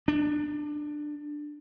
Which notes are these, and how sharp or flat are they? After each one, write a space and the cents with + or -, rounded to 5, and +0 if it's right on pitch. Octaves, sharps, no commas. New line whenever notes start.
D4 +15